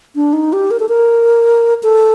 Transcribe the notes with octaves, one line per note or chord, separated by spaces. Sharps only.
D4
D#4
G4
A#4
A4
A#4
A4